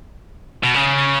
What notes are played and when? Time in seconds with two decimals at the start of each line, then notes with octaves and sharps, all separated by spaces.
0.63 B2
0.74 C#3